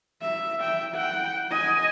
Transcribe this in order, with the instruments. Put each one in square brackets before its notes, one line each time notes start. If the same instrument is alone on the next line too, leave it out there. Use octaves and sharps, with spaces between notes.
[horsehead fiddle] E5
E5 G5
F#5 G5
D#5 G#5